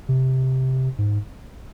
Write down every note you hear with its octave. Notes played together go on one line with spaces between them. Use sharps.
C3
G#2